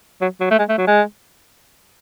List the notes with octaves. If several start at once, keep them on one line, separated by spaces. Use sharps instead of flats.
F#3
F#3
A3
G#3
A3
F#3
G#3